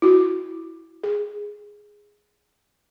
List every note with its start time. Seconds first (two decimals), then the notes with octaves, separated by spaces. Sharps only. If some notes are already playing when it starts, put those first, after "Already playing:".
0.02 E4 F#4
1.04 G#4